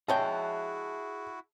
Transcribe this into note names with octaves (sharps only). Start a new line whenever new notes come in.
G#3 E4 F#4 G#4 C#5 E5 G5 A5